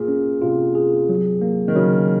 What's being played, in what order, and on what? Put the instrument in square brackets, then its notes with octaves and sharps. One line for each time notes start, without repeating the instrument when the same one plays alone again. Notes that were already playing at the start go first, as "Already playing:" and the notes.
Already playing: [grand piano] A#2 [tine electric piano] G#4
[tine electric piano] C#4
[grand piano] C3 [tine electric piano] F4
[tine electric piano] G#4
F#3
A#3
[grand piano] D#3
[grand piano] C#3 [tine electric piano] F#3